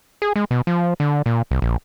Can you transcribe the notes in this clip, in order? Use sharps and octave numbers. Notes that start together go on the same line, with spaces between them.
G#4
G#3
B2
F3
D3
A#2
C2
A#1